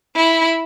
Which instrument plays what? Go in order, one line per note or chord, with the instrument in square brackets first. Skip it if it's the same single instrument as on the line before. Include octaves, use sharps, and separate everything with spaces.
[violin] E4